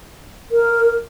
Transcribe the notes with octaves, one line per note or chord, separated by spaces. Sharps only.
A#4